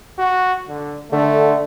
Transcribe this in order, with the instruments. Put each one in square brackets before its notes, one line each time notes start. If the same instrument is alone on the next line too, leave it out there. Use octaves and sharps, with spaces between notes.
[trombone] F#4
D3
[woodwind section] D3 [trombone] A3